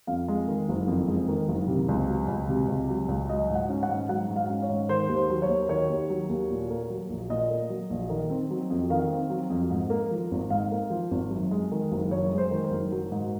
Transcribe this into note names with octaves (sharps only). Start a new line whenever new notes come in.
F2 F5
G#3
D#3
F#1
F2
G#3
D#3
F#1
C3
C#2
F#3
C#2
C3
C#2
F#3
C#2
F#3 D#5
G#2
F#5
C#4
F#5
G#2
F#3 F#5
G#2
F5
C#4
C#5
G#2
D#3 C5
D#2
C5
F#3
C#5
D#2
D#3 C#5
D#2
F#3
D#2
A#2
A#3
F#3
A#1
A#2 D#5
A#3
F#3
A#1
D#3
C4
F#3
F2
D#3 F5
C4
F#3
F2
G#2
A#3
F3
G#1
G#2 F5
A#3
F3
G#1
F#2
G#3
D#3
F#1
F#2 C#5
G#3
C5
D#3
A#4
F#1
F#3
G#2